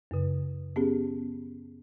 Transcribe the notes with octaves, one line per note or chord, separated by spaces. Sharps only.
F#2 C#3
B3 C#4 G4 G#4